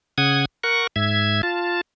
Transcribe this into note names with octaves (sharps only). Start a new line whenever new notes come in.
C#3 F#5 D#6 G#6
A#4 F#5 C#6
G#2 E5 G#6
F4 A5